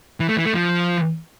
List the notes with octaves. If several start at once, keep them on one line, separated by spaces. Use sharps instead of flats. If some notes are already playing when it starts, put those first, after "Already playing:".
E3
A3
E3
A3
F3